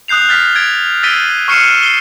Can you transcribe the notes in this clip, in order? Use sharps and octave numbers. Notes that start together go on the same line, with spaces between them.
D#6 F#6 G6 C7 F7
F6 A6 B6
G#6 A6 D7
E6 A6 B6 D7 D#7 G7
C#6 F6 C7 C#7 D#7 E7
C7 G7